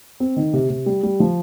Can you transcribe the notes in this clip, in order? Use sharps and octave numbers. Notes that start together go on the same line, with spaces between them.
C4
D#3
C3
C3
G3
G3
F3